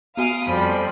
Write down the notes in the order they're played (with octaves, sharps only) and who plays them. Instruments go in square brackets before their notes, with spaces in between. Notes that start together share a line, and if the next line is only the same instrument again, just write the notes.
[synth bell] B3 F#4 G#5 [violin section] F5 D#6 D7
[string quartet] F2 F3 G3 [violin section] B5 C6